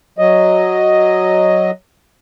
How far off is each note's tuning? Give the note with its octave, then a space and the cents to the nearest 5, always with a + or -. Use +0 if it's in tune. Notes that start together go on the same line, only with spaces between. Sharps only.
F#3 +0 D#5 +0